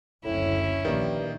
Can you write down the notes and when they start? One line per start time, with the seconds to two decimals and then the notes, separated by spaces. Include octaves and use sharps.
0.24 F#1 D2 A2 C#4 E4
0.85 A#1 G2 D#3 A#3